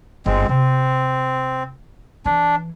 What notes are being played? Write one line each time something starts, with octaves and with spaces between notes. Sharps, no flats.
G1 G#3 C4 F4
C3 C4
E3 D4